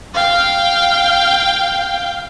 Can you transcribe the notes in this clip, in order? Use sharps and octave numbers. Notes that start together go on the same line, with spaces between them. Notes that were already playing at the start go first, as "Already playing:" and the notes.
F5 G5